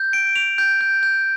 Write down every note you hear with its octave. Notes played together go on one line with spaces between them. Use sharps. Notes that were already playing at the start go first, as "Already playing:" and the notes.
Already playing: G6
D7
F7
G6
G6
G6